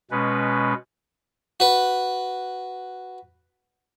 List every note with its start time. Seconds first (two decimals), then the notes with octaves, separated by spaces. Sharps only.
0.11 B2 G#3 C#4 B4
1.60 F#4 B4